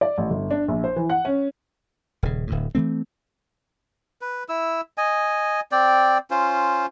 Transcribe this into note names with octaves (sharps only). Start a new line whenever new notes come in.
D5
A1
G1
D4
A#1
C5
E3
F#5
C#4
D#1 C#3
D1 D2 A2
E3 F3 A3 C4
B4
E4 E6
D#5 G#5
C4 D5 G5
C#4 F4 C5